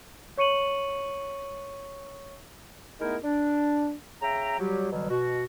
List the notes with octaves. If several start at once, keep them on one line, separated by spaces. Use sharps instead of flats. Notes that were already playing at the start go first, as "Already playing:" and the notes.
C#5 C#6 C#7 D#7 F#7
G#3 A3 B3 D#4 E4 A#4
D4
C#3 E5 G5 A#5
F#3 G3 G4
B2 D3 E3 F#3 G3
B2 F#4